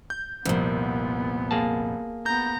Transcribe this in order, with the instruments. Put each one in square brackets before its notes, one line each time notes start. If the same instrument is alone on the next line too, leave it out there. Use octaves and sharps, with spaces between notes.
[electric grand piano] G6
[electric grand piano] C2 [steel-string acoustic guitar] F2 A#2 [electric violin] B3
[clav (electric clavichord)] A#3 G#4 A5
[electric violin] B3 A#5 [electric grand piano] G6